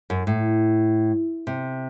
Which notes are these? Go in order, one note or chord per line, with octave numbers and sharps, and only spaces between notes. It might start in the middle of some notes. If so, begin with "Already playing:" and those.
F#2
A2
C3